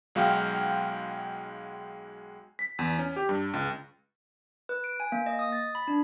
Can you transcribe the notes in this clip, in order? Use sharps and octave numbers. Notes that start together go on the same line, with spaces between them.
B1 G#3 F#4 F5 G5 F6
B6
E2
C#4
G4
G2
C#2
B4
D7
G#5
A#3
D#5
D#6
A6
B5
D4